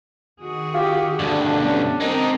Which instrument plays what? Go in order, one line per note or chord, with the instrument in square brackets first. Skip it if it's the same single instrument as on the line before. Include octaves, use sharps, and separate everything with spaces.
[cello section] D#3 F#4 G#4
[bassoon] F4 [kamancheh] G4
[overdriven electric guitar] D2 G2 [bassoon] D3 [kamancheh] D4
[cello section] G3 B3 C#4
[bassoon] D#3 [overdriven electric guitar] G#3 D#4 [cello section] C4 A#4